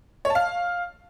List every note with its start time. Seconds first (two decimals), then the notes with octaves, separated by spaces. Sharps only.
0.25 C#5
0.30 A5
0.35 F5